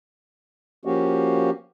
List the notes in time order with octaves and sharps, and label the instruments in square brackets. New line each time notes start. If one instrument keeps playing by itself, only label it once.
[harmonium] F3 A#3 C#4 F#4 G4